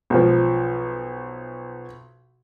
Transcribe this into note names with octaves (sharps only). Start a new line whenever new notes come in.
B1 F3